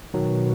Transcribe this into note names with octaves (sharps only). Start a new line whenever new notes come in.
B2 D#3 F#3